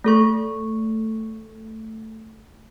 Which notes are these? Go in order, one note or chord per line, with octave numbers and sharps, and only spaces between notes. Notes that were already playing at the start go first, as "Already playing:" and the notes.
A3 A4 C#6